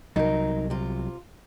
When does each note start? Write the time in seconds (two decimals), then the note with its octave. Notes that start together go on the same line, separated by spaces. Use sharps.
0.16 C2 F#3 D#4 A#4
0.70 C3 F4